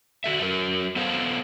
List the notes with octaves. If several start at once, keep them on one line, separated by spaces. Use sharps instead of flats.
F#4 A4 E5
F#3 A#4
B3 A4 C5 F5